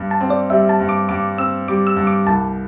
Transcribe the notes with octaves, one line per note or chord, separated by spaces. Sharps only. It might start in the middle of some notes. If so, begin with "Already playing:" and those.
Already playing: G2
A5
C4
D5
G3 E5
A5
G2
D6
G2 D6
C4 E6
G3 D6
E6
G2
D6
C2 A5